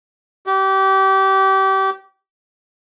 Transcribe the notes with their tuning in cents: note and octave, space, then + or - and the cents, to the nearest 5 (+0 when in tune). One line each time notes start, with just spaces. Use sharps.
G4 -30